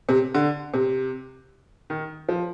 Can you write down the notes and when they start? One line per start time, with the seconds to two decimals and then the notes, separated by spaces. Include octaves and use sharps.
0.09 C3
0.34 D3
0.74 C3
1.90 D#3
2.29 F3